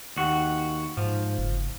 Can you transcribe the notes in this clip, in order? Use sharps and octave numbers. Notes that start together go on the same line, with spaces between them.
D#2 F#4
G#2 F3
F#1